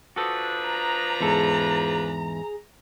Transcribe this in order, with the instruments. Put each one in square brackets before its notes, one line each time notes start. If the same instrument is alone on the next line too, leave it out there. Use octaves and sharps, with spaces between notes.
[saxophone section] F3 D4 B4 [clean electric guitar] F#4 A4 [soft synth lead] D#6
[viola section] A#5
[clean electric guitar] E2 G#2 A4 [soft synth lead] G#4